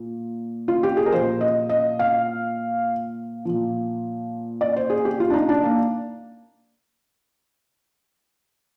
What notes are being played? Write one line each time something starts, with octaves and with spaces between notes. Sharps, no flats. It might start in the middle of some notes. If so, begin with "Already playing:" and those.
Already playing: A#2
F4
G4
G#4
A#4
A#2 F3 C5
D#5
D#5
F5
A#2 F3
D5
C5
G#4
G4
F4
D4
D#4
D4
A#3